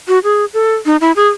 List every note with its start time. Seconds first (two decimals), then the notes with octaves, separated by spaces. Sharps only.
0.08 F#4
0.24 G#4
0.54 A4
0.86 D#4
1.01 E4
1.16 G#4